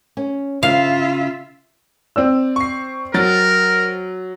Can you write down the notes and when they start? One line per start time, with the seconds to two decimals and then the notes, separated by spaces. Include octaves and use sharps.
0.17 C#4
0.63 C#3 F4 E5 F5
2.16 C4 D5 E6
2.56 C#6 C7
3.14 F#3 A#4 A6